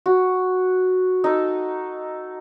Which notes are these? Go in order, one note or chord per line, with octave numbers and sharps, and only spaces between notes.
F#4
D#4 A4